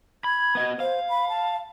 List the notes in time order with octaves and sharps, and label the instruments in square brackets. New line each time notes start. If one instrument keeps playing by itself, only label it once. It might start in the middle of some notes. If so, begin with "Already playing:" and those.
[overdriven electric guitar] B5 [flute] G#6
[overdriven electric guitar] B3 D#5
[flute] C5 [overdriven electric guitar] F5
[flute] B5
A5